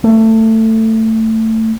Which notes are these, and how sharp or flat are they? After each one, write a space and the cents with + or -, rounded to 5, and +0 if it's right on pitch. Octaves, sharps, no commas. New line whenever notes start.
A3 +20